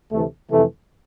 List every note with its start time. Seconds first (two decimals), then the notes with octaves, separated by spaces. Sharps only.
0.12 D2 C3 E3 A3
0.50 F2 C3 E3 A3